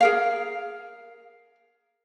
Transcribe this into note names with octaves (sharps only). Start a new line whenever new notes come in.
G#4 A#4 F5